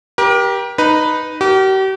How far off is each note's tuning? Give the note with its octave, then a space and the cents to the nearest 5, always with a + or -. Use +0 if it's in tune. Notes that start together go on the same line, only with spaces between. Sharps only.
G4 +0 A#4 +35
D#4 -10 B4 +0
G4 -40 A#4 +0